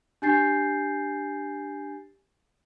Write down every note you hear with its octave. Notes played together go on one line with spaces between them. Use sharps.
D4 G4 G#5 G6 A6 C7